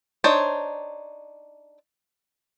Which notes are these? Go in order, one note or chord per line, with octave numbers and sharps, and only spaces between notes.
D4 D#4 C5 C#5